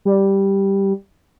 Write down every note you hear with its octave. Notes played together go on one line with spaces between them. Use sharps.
G3